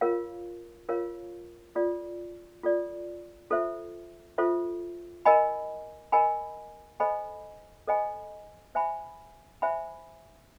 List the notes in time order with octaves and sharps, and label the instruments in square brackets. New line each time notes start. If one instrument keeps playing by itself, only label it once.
[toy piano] F4 A#4 C#5 F5
F4 A#4 C#5 F5
F4 A4 D5
F4 A4 D5
F4 A4 C5 E5
F4 A4 C5 E5
A#4 D#5 G#5 B5
A#4 D#5 G#5 B5
A4 C5 D#5 G#5 B5
A4 C5 D#5 G#5 B5
C5 E5 G#5 B5
C5 E5 G#5 B5